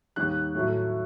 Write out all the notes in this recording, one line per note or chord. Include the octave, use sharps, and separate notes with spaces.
D#2 D#3 G3 F#6
A2 F#3 A3